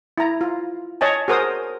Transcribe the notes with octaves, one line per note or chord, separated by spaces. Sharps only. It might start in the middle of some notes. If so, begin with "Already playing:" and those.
E4 A#5
F4
C#5 D#5 G#5 A5
F#4 G#4 A#4 C5 D#6